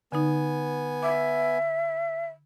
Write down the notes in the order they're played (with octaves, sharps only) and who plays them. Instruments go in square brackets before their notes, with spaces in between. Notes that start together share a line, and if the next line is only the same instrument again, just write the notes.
[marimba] D3 D#4 [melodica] B3 G#5
[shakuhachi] E5 [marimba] D6